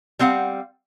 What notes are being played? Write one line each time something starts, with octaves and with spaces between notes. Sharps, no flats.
G3 C4 F5 F#5